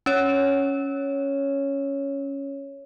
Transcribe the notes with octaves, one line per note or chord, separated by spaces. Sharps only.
C#4 C#5